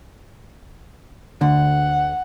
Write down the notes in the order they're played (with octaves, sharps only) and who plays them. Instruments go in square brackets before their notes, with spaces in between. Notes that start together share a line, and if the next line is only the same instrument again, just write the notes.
[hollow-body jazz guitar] D2 D3 [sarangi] F#5